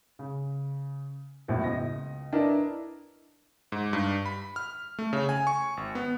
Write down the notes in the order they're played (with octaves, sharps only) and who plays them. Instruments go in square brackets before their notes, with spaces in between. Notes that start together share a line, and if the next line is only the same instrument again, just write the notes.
[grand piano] C#3
E1 A#1 F#2 A2
C#2 D#5 A#6
D4 E4 A#4 B4 D5 D#5
[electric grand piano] G#2
G2
B5
F6
A3
C#3
G#5
C#6
G#1
B3